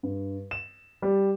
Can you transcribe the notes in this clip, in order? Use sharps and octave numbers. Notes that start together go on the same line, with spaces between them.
G2
E7
G3